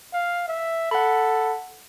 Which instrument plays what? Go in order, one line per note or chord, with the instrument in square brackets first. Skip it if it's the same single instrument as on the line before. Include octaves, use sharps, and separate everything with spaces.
[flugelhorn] F5
E5
[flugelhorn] A4 [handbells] F#5 B5